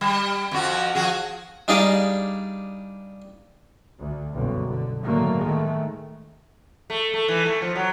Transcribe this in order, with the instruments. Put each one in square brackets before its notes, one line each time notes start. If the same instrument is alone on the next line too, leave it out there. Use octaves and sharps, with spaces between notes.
[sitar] G3
F2 F3 F#4
F3 F#4 G#4
[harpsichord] G3 D4 D#4 G#4 D5 F5
[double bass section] D2
F#1 B1 G2 D3
D3
A2 D3 D#3 F#3 A3 A#3
D#3 G#3 A3
[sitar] A3
A3
E3
A3
F3
F#3